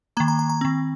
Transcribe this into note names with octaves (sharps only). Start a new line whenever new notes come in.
D#3 A#3 A#5
A#5
A#5
A#5
D#3 C4